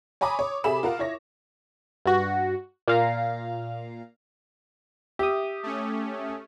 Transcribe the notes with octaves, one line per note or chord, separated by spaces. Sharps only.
C#5 G#5 A#5 B5 D6 D#6
C#5
C3 G#4 A4 E5 B5 E7
F4 A#4 F5 F#5
E4 C#5 A#6
G2 F#4
A#2 F5 A#5
G4 E5 D#6
A3 C#4